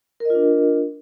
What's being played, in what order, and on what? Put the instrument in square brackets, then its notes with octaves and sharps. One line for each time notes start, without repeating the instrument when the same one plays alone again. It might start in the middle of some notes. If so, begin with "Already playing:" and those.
[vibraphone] A#4
D#5
F4
D4